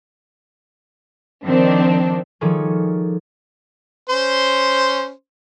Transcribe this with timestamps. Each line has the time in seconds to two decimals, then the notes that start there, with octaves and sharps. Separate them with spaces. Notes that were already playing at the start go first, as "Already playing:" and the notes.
1.46 D#3 F3 C4 D4
2.41 D#3 F3 G3 G#4 A4 C#5
4.09 C#4 C5 C6